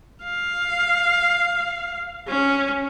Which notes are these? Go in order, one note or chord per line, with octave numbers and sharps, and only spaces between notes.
F5
C#4